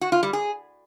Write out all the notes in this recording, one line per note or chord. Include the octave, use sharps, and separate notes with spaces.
F#4
F4
G3
G#4